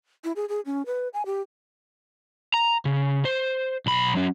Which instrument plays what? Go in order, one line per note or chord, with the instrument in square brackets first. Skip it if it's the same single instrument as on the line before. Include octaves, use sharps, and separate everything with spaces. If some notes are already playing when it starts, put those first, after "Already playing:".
[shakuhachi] E4
G#4
G#4
C#4
B4
G#5
G4
[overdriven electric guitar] A#5
C#3
C5
B1 B5
F#3 C#4